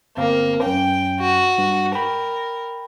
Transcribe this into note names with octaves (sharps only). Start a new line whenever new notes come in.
G1 A#3 C4 F5
F#2 C#4 G5
F#4
G2
A#4 G5 B5